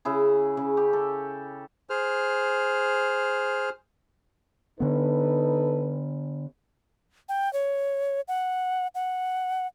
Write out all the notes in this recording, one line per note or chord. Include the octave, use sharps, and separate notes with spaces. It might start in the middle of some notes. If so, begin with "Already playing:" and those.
C#3 E4 G#4
C#3
G4
A4
G#4 C5 F6
D3 B3 D#4 A4 B4
G5
C#5
F#5
F#5